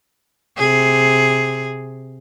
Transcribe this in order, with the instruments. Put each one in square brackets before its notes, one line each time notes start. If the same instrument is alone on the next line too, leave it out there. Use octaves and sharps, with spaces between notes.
[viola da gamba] C3 G#4